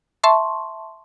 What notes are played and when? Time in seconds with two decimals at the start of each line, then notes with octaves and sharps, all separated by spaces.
0.24 E5 A5 C6 C#6